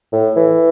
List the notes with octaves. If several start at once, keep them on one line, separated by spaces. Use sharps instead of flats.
A2
E3